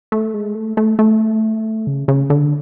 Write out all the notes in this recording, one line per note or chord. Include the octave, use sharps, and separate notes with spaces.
A3
G#3
A3
A3
A3
C#3
C#3
D3